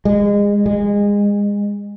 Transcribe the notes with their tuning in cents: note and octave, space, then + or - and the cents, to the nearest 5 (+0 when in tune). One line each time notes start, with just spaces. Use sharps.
G#3 -30
G#3 -25